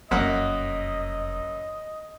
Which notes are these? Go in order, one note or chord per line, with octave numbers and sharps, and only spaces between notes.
F1 F#2 A#3 D#5 F#5